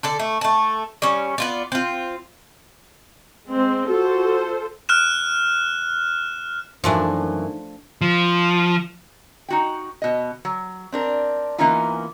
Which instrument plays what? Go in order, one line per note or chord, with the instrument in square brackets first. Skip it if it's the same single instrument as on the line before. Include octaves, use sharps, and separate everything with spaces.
[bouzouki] D3 A4 D5
A3
A3 A5
G3 C#4
B3 F4 D5
C4 F4
[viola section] G#3 C4
[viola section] F4 A4 C5 [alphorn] F#4
[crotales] F6 F#6 E7
[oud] F#2 E3 [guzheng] F3 A3 D4 [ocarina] D#4
[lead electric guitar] F3
[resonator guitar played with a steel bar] D#4 F#4 G5
B2 D#5
F#3
C4 D4 A#4
E3 A#3 B3 C#4 D#4 F4